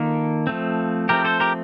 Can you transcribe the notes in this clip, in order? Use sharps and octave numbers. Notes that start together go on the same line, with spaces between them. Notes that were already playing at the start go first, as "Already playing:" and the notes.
Already playing: D#3 A#3 F4 A4
F3 A3 C4
F3 A3 C4 G4 A#4
A4 C5
G4 A#4